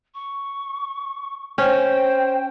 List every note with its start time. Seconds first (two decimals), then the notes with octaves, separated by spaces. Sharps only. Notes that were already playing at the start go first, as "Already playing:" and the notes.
0.14 C#6
1.58 C#4 C5 G5